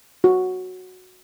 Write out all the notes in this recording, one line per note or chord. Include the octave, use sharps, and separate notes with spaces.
F#4